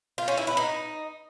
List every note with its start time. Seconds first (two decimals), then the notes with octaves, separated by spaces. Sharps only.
0.18 F4
0.28 C#4
0.37 E4
0.47 B4
0.57 D#4